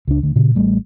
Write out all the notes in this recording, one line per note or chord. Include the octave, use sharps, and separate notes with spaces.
C#2 D4
D2 D3
A#2 C#3
A1 G3 A3